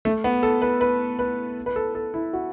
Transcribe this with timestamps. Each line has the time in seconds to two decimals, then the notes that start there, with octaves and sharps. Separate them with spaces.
0.05 A3
0.24 B3
0.43 A4
0.62 B4
0.81 B4
1.19 B4
1.66 B4
1.76 A4
1.95 A4
2.14 E4
2.33 F#4